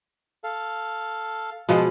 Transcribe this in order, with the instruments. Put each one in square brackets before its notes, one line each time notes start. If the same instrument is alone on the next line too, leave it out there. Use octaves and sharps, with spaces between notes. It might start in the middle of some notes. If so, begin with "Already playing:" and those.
[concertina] A4 F5
[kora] B2 F3 G#3 [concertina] A5